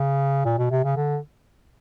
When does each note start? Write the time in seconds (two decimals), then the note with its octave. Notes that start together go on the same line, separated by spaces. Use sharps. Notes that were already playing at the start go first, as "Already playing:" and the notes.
Already playing: C#3
0.45 A#2
0.58 B2
0.71 C3
0.84 C#3
0.96 D3